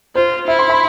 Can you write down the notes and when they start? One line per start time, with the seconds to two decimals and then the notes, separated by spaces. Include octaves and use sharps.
0.15 F4 C5
0.48 E4 E5
0.59 C6
0.70 B5